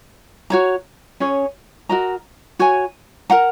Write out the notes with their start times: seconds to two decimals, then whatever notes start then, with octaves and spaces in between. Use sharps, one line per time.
0.50 F#4 C#5 A#5
1.20 C#4 G#4 C#5
1.89 F#4 A#4 D#5 A#5
2.59 F#4 C#5 G#5
3.30 A#4 F#5 A#5